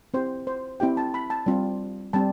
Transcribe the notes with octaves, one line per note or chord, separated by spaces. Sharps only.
C4 E4 G4 C5
C5
C4 E4 G4 G5
A5
B5
A5
G3 C4 F4
G3 C4 A5